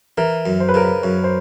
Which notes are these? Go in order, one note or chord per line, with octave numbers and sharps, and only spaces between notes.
E3 A#4
F#2
C5
B4
C#3 A#4
B4
F#2 C#5
C5